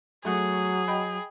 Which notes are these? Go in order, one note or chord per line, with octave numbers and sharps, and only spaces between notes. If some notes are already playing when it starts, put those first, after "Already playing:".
F#3 A3 F#4 G#4
D#5 G5 B5